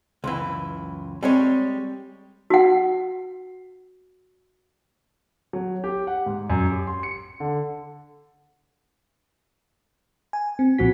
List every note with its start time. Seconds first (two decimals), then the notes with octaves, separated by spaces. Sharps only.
0.24 C#2 F#2 E3
1.23 G3 G#3 C4 C#5
2.50 F#4 F#5
5.53 F#3
5.84 G4
6.07 F#5
6.26 G#2
6.50 F#2
6.70 G4
6.87 C6
7.03 C#7
7.40 D3
10.33 G#5
10.59 C4
10.78 B1 A#2 F3 C4 F#4 B6